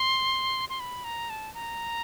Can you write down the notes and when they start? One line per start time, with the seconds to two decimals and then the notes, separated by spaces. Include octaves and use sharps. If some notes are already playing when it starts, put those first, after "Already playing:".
Already playing: C6
0.70 C6
0.80 B5
1.04 A#5
1.30 A5
1.54 A#5